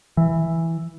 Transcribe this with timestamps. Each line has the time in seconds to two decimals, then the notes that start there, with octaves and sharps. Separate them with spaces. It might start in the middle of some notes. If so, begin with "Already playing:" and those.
0.17 E3